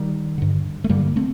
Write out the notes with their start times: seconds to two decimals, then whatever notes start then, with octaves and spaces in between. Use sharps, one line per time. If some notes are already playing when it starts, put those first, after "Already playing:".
Already playing: D#3 G3
0.38 G2 D3
0.84 A3
0.89 G2 D3 G3 A#3
1.16 A3 C4